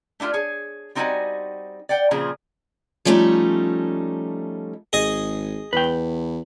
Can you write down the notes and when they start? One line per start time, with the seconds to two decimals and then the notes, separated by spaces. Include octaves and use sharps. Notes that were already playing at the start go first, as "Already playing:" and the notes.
0.20 A3 D4 E4 F4 G4
0.33 G#4 C#5
0.95 G3 C4 D#4 E4 F#4 G#5
1.89 D5 F#5 G5
2.11 A#2 C#3 F3 C4 G#4
3.05 F3 G3 A3 C#4 D#4
4.93 G#1 G#4 D#5
5.73 E2 B4 G5